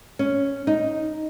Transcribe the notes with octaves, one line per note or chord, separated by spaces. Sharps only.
C#4
D#4